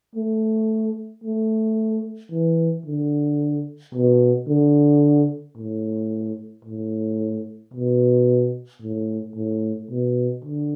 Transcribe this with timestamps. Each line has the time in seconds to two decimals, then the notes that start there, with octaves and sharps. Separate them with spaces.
0.15 A3
1.24 A3
2.31 E3
2.85 D3
3.94 B2
4.48 D3
5.58 A2
6.65 A2
7.74 B2
8.82 A2
9.36 A2
9.91 B2
10.45 D3